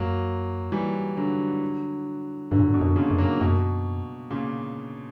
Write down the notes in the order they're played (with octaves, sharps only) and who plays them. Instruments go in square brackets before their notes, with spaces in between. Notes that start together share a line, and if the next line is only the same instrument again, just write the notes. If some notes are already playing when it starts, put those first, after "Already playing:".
Already playing: [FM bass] F#2 [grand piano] F#3 A#3
[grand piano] E3 G3
D3 F#3
[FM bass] G2 [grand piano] D3 F#3
[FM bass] A#2
G2
[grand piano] B2 D3
[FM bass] F#2
[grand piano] A#2 C#3
[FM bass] F#2
[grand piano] F#3 A#3
[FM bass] F#2 [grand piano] B2
[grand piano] A#2 C#3